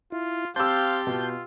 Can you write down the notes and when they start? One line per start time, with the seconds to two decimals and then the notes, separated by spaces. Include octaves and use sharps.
0.12 E4 F4
0.56 C4 G4 F5 A5 C6 E6 G6
1.07 B2 F4